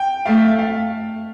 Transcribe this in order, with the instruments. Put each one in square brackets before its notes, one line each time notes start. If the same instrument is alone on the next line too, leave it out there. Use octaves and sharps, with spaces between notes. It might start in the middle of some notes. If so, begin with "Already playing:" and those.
Already playing: [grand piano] G5
[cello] A3 [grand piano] F5
[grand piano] F5